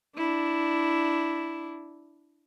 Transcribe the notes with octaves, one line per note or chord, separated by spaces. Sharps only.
D4 E4